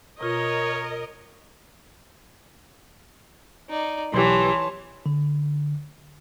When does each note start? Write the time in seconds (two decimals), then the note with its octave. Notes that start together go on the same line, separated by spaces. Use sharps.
0.21 B2 F4 A#4 C#5 D#5
3.69 D#4 D5
4.14 B1 E3 G4 C#5 A5 C6
5.06 D3